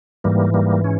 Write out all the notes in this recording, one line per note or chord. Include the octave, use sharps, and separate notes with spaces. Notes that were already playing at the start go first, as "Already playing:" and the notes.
G#2 E3 G3 A#3
G3 A#3
C#4